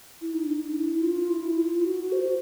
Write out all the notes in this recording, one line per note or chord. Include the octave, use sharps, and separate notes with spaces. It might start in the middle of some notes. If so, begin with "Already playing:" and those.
E4
D#4
D4
E4
F4
E4
F4
E4
F4
F#4
C5